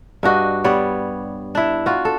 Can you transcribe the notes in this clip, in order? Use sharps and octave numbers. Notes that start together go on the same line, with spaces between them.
G2 D4 F#4 D#5
G3 B3 C#5 D5
D4 E4
F4 F#4
A4